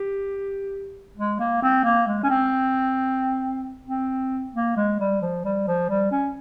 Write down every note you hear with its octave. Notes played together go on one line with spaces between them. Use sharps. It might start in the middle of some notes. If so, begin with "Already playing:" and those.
Already playing: G4
G#3
A#3
C4
A#3
G#3
C#4
C4
C4
A#3
G#3
G3
F3
G3
F3
G3
C#4